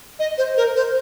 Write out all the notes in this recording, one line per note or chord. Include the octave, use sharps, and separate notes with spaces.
D#5
C5
A#4
C5